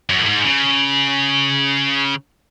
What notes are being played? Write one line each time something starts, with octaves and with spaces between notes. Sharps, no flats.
F#2
A2
G#2
C#3